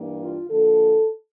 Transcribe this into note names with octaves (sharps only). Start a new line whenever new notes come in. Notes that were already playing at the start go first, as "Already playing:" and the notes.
Already playing: G2 E3 A#3
F4
D3 F3 A#3 A4